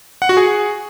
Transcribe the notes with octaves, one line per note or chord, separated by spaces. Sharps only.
F#5
F#4
G#4